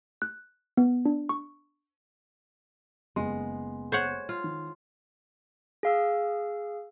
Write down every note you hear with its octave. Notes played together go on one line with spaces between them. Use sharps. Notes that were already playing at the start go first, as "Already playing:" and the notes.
F#6
B3
D4
C#6
F#1 G#3 B3 C6
C5 C#5 F#5
F4
D#3
G#4 F5 E6